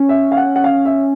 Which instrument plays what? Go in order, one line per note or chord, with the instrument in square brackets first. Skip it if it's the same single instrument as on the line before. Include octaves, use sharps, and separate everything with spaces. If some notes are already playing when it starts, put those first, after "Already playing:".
Already playing: [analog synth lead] C#4
[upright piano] E5
F5
F#5
F#5
F5
E5